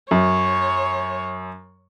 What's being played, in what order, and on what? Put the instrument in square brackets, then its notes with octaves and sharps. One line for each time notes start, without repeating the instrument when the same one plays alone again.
[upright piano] F#2 [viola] C#5